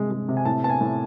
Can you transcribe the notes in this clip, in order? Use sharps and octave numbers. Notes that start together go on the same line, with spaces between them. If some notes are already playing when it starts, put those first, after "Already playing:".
Already playing: C3 G#3
G#3
C3
G#5
A2 A5
B3 A5
G#5
A2